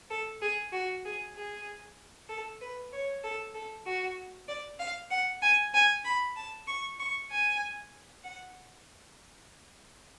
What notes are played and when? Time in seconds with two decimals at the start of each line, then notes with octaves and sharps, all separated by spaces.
0.10 A4
0.41 G#4
0.72 F#4
1.04 G#4
1.36 G#4
2.29 A4
2.61 B4
2.92 C#5
3.24 A4
3.54 A4
3.86 F#4
4.48 D5
4.79 F5
5.10 F#5
5.42 G#5
5.74 G#5
6.04 B5
6.36 A5
6.67 C#6
6.99 C#6
7.30 G#5
8.24 F#5